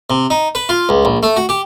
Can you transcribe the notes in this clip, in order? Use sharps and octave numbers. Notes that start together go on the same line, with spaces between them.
C3
D#4
B4
F4
C#2
A#1
A3
F#4
G4